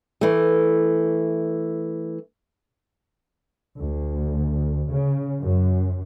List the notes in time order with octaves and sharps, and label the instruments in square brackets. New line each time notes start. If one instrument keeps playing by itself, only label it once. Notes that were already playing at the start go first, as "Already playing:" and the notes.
[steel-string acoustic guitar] E3 A3
[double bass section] D2
C#3
F#2